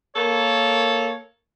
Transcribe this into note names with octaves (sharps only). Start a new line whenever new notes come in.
A#3 A4 A#4 C#5